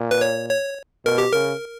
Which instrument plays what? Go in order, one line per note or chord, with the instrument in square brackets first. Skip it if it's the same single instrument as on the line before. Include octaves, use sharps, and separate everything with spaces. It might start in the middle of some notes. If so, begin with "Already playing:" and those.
Already playing: [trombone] A#2
[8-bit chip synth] B4
C#5
C#5
[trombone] B2 [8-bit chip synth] A#4
[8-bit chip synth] G4
[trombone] C#3 [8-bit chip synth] A#4